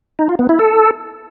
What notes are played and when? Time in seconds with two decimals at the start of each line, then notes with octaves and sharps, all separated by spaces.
0.19 D#4
0.29 F4
0.39 B3
0.49 E4
0.59 A4